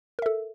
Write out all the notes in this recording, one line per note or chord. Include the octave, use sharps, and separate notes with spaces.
A4 A#4 E5